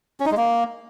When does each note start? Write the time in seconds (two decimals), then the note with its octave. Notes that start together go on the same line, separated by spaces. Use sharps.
0.20 C#4
0.26 D#4
0.31 G#3
0.37 A#3